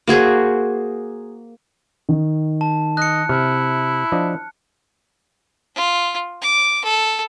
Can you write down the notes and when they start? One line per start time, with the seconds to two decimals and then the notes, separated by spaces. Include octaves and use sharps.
0.07 A#3 F#4 G#4 C5
2.09 D#3
2.61 A5
2.97 D#5 F#6 C#7
3.29 C3 E4 F6
4.12 F3 D4 D#5
5.75 F4
6.42 D6
6.85 A4